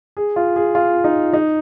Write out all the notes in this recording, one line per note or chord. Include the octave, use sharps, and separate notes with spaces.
G#4
F4
G#4
F4
D#4
D#4